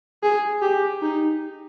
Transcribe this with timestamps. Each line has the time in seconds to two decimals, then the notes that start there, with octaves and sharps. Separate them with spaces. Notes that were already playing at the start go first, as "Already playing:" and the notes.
0.23 G#4
0.62 G4
1.02 D#4